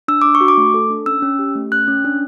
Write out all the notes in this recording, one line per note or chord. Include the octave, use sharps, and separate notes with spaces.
D4 E6
D4 D6
C#6
F#4
D6
A3
A4
D4
C#4 E6
C#4
G4
A3
C#4 F#6
C#4
D4